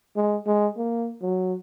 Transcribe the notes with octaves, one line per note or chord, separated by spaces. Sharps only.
G#3
G#3
A#3
F#3